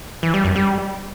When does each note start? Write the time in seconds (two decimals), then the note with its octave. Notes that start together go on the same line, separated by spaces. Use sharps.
0.23 E3
0.34 G3
0.45 F#2
0.56 G3